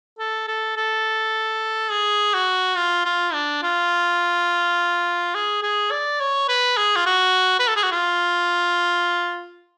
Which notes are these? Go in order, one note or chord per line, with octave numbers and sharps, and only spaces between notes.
A4
A4
A4
G#4
F#4
F4
F4
D4
F4
G#4
G#4
D5
C#5
B4
G#4
F4
F#4
B4
A4
G#4
F#4
F4